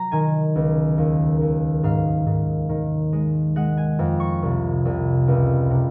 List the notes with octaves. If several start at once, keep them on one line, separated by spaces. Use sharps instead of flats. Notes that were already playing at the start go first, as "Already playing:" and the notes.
Already playing: F#3 A#5
D#3 G#5
C#2
D#2
D#2
G#2 F5
G#2
D#3
G#3
G#3 F#5
G#5
F2
C#6
C2
C2
C#2
C3